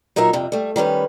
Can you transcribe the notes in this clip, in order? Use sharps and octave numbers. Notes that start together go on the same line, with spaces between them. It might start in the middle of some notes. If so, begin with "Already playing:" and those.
A#2 F#3 D#4 A#4 E5
F2 C3 G3
G3 A3
D#3 G3 C#4 B4